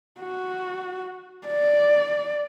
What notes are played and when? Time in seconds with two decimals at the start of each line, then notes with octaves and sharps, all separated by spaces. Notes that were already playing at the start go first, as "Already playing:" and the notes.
0.21 F#4
1.47 D5